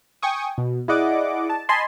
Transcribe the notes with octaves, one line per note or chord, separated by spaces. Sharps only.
G5 G#5 C#6 D#6
B2
E4 G#4 D5 D#5 F#5 D6
A5
D#5 G#5 A5 B5 C6